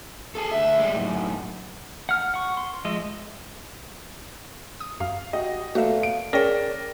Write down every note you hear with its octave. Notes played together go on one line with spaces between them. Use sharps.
G#4 A4
D2 E5
G3 G#3
F#2 A2
F#5 F6
F#5 C#6
C6
F3 G#3 D#5 E5
D#6
F#2 F5
F#4 G4 D#5
E2 A3 A#3 F#4 E5 F5
D7
C#4 G#4 A#4 C#5 D5 G5 A#6